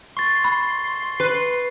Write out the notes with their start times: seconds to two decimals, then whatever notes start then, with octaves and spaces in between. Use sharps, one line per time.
0.17 C6 C#6 A6
0.44 B5
1.20 B4 C7